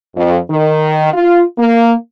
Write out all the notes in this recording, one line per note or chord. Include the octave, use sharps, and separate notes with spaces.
F2
D#3
F4
A#3